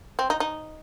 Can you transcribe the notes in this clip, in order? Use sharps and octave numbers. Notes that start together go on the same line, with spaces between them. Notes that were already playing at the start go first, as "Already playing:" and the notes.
C4
D#4
D#4